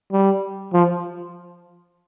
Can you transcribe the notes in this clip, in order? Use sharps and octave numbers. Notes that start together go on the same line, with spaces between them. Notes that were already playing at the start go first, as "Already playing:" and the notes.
G3
F3